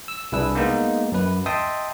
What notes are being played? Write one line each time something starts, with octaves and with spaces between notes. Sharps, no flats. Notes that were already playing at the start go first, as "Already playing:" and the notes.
E6
C2 D4 E4 G#4 B4 E6
G#3 A#3 B3 D#4
F#2 B4
D#5 E5 G5 A5 C6 D#6